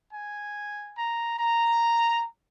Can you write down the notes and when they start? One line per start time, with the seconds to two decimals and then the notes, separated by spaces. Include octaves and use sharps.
0.13 G#5
0.95 A#5
1.38 A#5